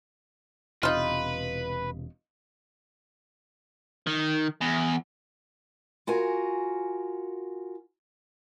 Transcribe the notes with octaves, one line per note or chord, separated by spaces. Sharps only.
E1 C3 D#4 F4 B4
D#3
E2
F4 F#4 A#4 G#5